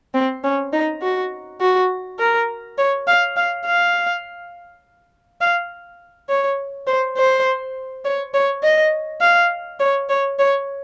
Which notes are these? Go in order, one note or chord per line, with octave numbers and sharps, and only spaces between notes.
C4
C#4
D#4
F#4
F#4
A#4
C#5
F5
F5
F5
F5
C#5
C5
C5
C#5
C#5
D#5
F5
C#5
C#5
C#5